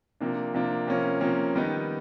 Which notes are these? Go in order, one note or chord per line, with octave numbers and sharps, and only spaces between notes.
C3 F3 A#3 D4
C3 F3 A#3 D4
C3 F3 A#3 C#4
C3 F3 A#3 C#4
D#3 G3 B3 D#4